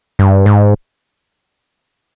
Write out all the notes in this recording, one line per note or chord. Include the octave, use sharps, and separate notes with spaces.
G2
G#2